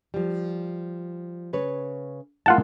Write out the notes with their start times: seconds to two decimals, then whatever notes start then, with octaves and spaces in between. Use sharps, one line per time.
0.14 F3 G3
1.53 C#3 B4 C#5
2.46 G#3 A#3 E4 F4 F#5 A5